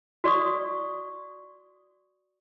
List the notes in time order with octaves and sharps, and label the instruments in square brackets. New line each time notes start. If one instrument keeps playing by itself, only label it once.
[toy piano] F#4 D5 C#6 D#6